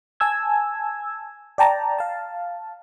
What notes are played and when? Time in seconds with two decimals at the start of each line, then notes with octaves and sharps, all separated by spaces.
0.20 G#5 A5 E6 G#6
1.58 D5 G5 A5 A#5
1.98 F5 A5